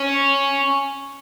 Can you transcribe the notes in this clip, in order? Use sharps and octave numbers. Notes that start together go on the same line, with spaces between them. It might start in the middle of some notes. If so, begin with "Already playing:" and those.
Already playing: C#4